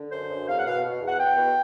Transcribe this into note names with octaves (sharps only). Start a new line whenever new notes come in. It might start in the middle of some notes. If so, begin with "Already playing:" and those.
Already playing: D3
F#2 C5
F#2
E2 F5
F#5
B2 F5
B2
E2
F#5
E2 G5
B2